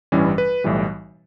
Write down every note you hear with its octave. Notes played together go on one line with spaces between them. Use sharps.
A1 G2 E3 G3 C#4
B4
B1 A2 E3 G3